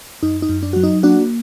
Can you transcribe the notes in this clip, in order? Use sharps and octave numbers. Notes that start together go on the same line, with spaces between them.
F#2 D#4
D#4
F#2
D4
F#3 F#4
D#4
A#3 D4 F#4